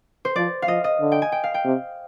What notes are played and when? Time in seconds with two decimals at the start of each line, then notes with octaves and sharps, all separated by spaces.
0.25 C5
0.36 F3 D5
0.62 F5
0.68 F3 D#5
0.84 D#5
1.01 D3
1.12 G5
1.22 G#5
1.32 G5
1.44 F5
1.54 G5
1.65 C3